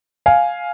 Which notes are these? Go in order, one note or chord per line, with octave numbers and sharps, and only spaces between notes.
F5 G#5